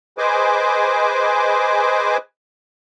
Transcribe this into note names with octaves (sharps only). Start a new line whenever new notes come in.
G#4 B4 C5 D#5 G#5 D6